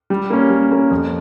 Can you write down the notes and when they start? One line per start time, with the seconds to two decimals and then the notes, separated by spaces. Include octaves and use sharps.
0.10 G3
0.30 A#3 C#4
0.50 G3
0.71 A#3 C#4
0.91 F2